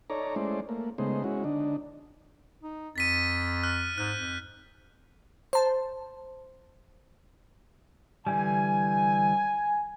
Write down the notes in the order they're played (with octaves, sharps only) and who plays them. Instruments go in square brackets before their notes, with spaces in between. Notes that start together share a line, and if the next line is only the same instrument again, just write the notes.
[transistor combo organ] D#4 A4 C#5 D5 A#5
G#3 A3 C#4 E4 C5 D5
A3 A#3
C#3 G#3 A3 B3 D#4 C5
G#3 C#4 E4 F#4
D3 D4 D#4
[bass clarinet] D#4
[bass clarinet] F2 [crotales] A6 B6 D#7
[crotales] F6 F#6
[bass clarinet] G#2 [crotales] F#6 G6
[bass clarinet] F2
[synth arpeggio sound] C5 A5
[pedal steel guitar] D3 E3 G3 [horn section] G#5